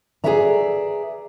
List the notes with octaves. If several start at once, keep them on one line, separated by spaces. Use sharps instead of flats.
G#4 A#4 B4 D5 E5 A#5